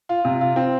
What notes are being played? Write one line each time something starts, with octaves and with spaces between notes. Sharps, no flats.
F4
C3
F4
C4